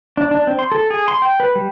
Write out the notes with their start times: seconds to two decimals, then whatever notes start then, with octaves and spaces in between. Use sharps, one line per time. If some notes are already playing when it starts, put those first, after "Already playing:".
0.17 D4
0.31 D4
0.47 C4
0.59 C6
0.72 A4
0.90 G#4
1.08 C6
1.22 G5
1.40 B4
1.55 G3